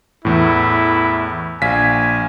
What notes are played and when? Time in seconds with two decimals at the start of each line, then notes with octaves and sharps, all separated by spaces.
0.25 E2 A2 E4
1.62 A#1 F5 G#5 B6